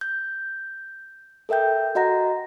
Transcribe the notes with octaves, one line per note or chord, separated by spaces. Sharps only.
G6
A4 A#4 E5 G5 G6
F#4 D#5 F#5 A#5 A#6